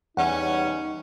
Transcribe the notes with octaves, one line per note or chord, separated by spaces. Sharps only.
E2 G3 C#4 D#4 F#5